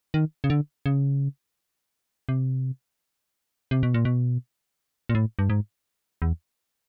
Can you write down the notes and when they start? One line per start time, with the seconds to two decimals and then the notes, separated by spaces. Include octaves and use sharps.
0.14 D#3
0.44 C#3
0.50 D3
0.86 C#3
2.29 C3
3.71 C3
3.83 B2
3.94 A#2
4.05 B2
5.09 A#2
5.15 A2
5.39 G2
5.50 G#2
6.22 E2